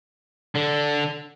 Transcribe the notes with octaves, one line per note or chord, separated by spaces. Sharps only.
D3